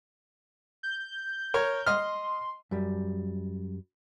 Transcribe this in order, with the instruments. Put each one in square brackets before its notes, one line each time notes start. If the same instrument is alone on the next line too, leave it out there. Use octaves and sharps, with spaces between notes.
[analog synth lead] G6
[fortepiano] A#4 C#5
[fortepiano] D#5 F6 [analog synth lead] C6
[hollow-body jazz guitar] F#2 G3